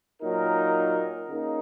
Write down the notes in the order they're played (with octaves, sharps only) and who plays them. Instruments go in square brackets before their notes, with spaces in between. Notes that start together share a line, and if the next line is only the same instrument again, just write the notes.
[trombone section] A#2 F#3 D#4 A#4
C#3 A#3 D#4